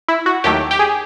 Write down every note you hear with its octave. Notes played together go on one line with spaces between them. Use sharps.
E4
F#4
D#2 D#3 F#3 A3 G4
G4
G#4